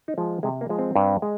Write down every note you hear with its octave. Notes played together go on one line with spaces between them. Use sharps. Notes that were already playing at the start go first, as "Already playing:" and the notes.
D#4
F3 G#3
C3 G#3
A#3
F3 G#3
C4
G2
G#3